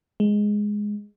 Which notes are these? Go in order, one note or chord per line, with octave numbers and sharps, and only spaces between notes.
G#3